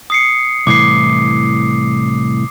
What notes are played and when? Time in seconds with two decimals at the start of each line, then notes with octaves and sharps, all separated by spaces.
0.10 D#6 C7 C#7
0.67 C2 A2 E3 D6 C7